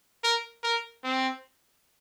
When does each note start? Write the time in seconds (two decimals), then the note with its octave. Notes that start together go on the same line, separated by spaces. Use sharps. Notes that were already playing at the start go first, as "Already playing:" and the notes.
0.24 A#4
0.64 A#4
1.04 C4